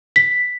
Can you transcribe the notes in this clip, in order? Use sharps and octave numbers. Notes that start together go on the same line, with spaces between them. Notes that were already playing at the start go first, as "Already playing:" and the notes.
B6